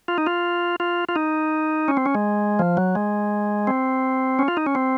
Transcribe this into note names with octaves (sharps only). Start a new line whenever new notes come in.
F4
D#4
F4
F4
F4
D#4
C#4
C4
C#4
G#3
F3
F#3
G#3
C4
C#4
F4
D#4
C#4
C4